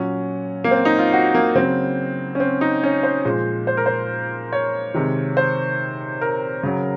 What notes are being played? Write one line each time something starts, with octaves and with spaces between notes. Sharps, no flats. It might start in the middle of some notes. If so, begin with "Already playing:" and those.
Already playing: A#2 F#3 C#4
A#3
C4
D#4
F4
F#4
A#3
C#3 F#3 C4
C#4
C4
D#4
C#4
C5
A#2 F3 G#3
C5
A#4
C5
C#5
C3 D#3 G#3
C5
A#4
C#3 F#3